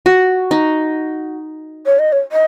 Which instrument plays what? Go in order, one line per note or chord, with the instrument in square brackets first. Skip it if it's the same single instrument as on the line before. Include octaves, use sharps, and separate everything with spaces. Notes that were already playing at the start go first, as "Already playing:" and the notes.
[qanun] F#4
D#4
[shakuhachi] C#5
D#5
C#5
D#5